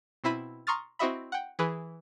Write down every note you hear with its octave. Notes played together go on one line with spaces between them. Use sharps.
B2 C4 E4 B5 D#7
A#5 C6 C#6 D#6 F6 A6
C4 E4 F#4 D#5 E5 B5
F#5 G5
E3 G#4 B4